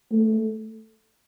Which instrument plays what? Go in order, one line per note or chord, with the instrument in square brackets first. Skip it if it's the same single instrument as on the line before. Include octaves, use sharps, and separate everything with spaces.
[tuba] A3